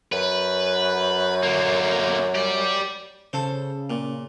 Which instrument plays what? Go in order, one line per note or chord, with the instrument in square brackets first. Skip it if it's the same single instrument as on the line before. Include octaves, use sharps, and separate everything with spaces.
[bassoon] F#2 [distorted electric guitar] B4
[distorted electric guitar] D3 A#3
G4 D5
[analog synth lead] C#3 [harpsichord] A4 C5
[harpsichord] A#2